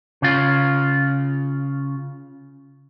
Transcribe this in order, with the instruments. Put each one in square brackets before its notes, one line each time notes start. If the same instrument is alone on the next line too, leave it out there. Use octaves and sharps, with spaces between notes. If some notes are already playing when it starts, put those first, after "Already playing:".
[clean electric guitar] C#3 F4